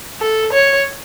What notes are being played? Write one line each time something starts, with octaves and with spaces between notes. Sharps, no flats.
A4
C#5